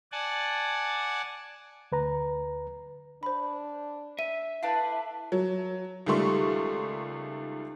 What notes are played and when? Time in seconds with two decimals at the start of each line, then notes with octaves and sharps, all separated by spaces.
0.12 D5 F#5 G#5 A5
1.92 D2 B4 A#5
3.23 D4 C5 B5
4.19 E5 D#7
4.63 A3 D4 E4 B4 F5
5.32 F#3
6.06 C#2 D#3 G3 A3 C6 C#6